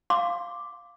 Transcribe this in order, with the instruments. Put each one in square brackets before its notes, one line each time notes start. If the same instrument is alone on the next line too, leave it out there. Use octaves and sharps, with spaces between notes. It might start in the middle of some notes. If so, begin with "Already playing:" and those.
[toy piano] F5 D6 [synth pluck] C6